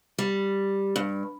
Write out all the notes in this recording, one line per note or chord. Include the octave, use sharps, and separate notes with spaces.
G3
G2